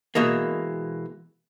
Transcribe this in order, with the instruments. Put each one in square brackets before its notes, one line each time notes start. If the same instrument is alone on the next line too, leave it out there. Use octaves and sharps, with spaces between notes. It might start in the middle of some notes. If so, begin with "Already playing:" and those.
[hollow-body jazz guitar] B2 E3 G#3 A#3